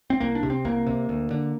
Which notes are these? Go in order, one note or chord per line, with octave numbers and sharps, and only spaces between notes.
C4
C2 A#3
D4
C3
C4
C2 A#3
C3
D2
D3